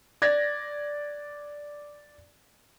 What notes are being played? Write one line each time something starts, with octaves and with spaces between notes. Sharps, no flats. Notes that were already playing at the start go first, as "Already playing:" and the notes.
D5 G#6 A#6